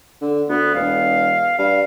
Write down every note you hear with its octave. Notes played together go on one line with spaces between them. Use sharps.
D3
D2 B3
E1 F5
G2 F5